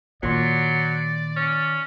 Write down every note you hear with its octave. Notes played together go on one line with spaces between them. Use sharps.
A#2 D#3 F#3 D5 C6
C#4